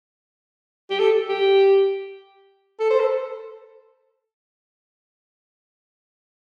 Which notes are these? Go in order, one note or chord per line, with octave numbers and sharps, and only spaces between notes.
G4
A4
G4
A4
C5
A4